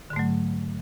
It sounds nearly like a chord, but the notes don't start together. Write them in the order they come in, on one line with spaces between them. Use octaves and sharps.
D3 G#2 A3 F#3